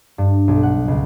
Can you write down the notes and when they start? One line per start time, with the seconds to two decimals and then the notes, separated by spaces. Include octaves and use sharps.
0.18 G2
0.48 B1
0.63 F#5
0.88 C#2